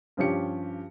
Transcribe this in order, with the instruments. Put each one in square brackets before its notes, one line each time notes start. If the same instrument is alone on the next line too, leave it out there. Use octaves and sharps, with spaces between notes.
[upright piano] G2 F3 C#4 G4 C#7